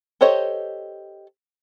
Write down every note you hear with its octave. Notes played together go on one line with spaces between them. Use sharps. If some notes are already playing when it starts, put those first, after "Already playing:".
G4 A4 C5 C#5 D#5